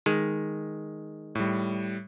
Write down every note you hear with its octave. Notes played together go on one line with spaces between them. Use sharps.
D#3 G#3
A2 G3